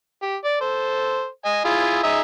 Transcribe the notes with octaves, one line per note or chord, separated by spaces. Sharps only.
G4
D5
A4 C5
D#5 G#5
E4 F4 G#4
D#4 G#4 E5